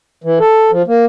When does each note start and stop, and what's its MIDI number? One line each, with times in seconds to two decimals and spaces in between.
0.24 0.39 52
0.40 0.71 69
0.71 0.82 53
0.87 1.06 58